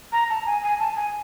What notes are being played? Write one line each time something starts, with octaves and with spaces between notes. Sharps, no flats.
A#5
A5
G#5
G#5
A5
G#5